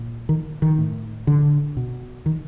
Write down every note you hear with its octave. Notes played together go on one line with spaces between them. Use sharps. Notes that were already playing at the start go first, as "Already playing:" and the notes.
Already playing: A#2
D#3
D#3
A2
D3
B2
D#3